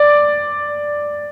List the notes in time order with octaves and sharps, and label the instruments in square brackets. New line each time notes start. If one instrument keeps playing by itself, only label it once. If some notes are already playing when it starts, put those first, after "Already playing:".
Already playing: [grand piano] D5